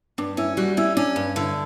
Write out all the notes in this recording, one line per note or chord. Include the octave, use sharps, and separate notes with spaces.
G2 D4
C#4 E4
G3 F#4
C#4 E4
C#4 D4
G2
D3 E4